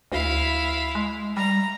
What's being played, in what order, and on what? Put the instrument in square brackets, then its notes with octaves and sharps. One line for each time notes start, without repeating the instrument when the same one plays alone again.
[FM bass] D2 [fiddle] E4 F5
[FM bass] G#3
[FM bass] G3 [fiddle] A#5